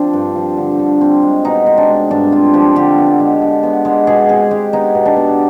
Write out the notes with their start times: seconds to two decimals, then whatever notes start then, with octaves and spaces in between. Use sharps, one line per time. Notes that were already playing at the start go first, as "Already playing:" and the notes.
Already playing: F3 C4 D4
0.13 G2
0.36 F3
0.57 D3
0.79 D3
1.01 C4
1.23 G#3
1.45 B2 D#4
1.66 C4
1.78 D4
1.88 G#3
2.11 G2 D4
2.32 C4 F4
2.54 F3 G4
2.76 D3 G4
2.98 B3
3.20 G#3
3.42 D3
3.63 B3
3.85 G#3
4.07 B2 G#4
4.29 C4 G#4
4.51 G#3 G4
4.73 B3 D#4
4.95 B2
5.06 D4
5.16 B3